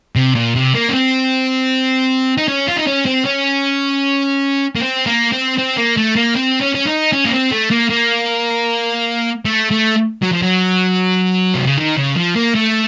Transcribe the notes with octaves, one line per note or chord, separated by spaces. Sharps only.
C3
A#2
C3
A#3
C#4
C4
D#4
C#4
F4
D#4
C#4
C4
C#4
A#3
C4
A#3
C4
C4
A#3
A3
A#3
C4
C#4
C#4
D#4
C#4
A#3
C4
A3
A#3
A#3
A3
A3
F#3
F3
F#3
C3
C#3
D#3
C#3
F3
A#3
A3